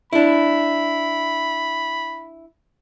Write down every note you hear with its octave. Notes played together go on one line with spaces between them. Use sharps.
D4 E4 B5